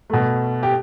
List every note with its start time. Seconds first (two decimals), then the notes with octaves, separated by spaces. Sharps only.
0.10 B2 A3
0.63 G4